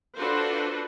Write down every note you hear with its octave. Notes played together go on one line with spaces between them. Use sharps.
D4 F4 F#4 A4 B4 C5